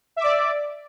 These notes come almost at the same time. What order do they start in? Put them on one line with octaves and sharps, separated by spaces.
E5 D6 D5